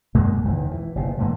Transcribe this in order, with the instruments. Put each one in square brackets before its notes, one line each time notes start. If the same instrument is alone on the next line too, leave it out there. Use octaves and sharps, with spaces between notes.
[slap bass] B1 F#2 G#3 A#3
E1 C#2 D#3 E3
E3
F#1 B2
F1 G#2 E3 A#3